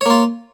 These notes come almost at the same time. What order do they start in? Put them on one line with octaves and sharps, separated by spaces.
C#5 A#3 F4